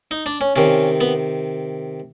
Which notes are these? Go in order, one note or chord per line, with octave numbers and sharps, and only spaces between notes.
D#4
D4
C#4
C3 D#3 C#4
B3